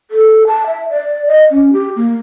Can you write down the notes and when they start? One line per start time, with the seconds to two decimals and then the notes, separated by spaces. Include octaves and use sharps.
0.11 A4
0.47 A5
0.66 E5
0.90 D5
1.27 D#5
1.51 C#4
1.73 G4
1.96 A#3